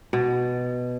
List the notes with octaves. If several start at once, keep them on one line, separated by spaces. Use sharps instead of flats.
B2